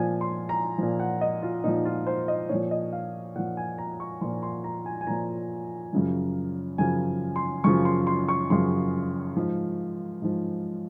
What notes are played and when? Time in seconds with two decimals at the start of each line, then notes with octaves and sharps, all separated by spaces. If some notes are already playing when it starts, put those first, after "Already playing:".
Already playing: A#2 F3 G#5
0.21 C6
0.49 A#5
0.78 A#2 F3
1.00 F#5
1.21 D#5
1.42 F4
1.64 A#2 F3 D#4
1.85 F4
2.07 C5
2.28 D#5
2.49 A#2 F3 C#5
2.71 D#5
2.93 F5
3.35 A#2 F3 F#5
3.57 G#5
3.78 A#5
4.00 C#6
4.21 A#2 F3 C6
4.43 C6
4.64 A#5
4.86 G#5
5.01 G#5
5.07 A#2 F3 A#5
5.93 F#2 C#3 F3
6.78 F#2 C#3 F3 G#5
7.36 C6
7.64 F#2 C#3 F3 C#6
7.85 C6
8.07 C6
8.29 C#6
8.50 F#2 C#3 F3 C6
9.36 G#2 F3
10.22 G#2 F3